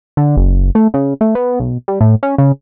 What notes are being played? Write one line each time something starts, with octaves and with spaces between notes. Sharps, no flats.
D3
F#1
A3
C#3
A3
B3
B1
G3
A2
C#4
C#3